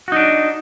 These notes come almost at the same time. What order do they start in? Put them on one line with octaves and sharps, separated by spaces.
F#4 D#4 D4